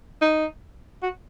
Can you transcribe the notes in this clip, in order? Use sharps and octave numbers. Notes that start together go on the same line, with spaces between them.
D#4
F#4